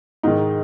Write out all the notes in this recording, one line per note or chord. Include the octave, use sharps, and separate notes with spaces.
G#2 D#3 D#4